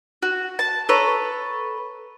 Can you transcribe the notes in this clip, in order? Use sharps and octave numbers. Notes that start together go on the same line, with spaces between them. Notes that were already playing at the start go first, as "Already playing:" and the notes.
F#4
A5
A4 B4 C#5 A#5